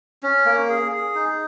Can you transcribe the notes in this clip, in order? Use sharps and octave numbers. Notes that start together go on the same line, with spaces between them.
C#4
A#3
G#4
G#4
D#4